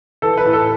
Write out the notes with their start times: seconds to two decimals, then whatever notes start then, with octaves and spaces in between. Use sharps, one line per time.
0.22 E3 A4
0.38 B4
0.45 A2
0.53 A4